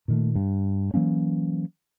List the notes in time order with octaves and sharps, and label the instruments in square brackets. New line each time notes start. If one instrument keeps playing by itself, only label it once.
[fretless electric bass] A#2 D#3 A3
G2
E3 F#3 A#3 C#4